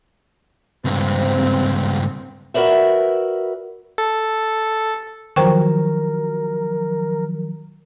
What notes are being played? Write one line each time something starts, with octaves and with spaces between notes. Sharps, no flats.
C#2 G2 C4
F#4 A#4 B4 D5 E5
A4
D#3 F3 F#3 A#4 C5 G5 C#6